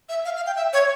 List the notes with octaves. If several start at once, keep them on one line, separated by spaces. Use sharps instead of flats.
E5
F5
F5
G5
E5
C#5